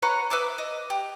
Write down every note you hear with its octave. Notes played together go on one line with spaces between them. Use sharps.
B4 C#5 F#5 A#5
B4 E5 D6 D#6
D#5
G4